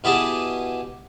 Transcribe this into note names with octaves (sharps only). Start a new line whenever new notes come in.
B2 E4 G4 G#4 A5